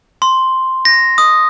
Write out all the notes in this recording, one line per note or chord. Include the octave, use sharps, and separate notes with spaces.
C6
A#6
D#6